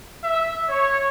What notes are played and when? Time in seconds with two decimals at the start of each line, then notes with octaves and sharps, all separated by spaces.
0.23 E5
0.68 C#5